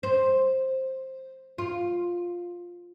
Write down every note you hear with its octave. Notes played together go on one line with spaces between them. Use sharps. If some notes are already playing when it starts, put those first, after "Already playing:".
C5
F4